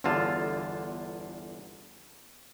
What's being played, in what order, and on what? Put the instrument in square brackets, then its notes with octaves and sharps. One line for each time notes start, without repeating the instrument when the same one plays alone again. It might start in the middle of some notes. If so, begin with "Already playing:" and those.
[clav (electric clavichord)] G1 E2 D3 F4 A5